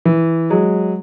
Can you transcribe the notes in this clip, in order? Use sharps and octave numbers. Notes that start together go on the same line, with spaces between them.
E3
F#3 G#3